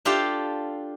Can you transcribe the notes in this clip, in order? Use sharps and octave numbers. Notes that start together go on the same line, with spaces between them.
D4 F4 G4 A4 F5 G5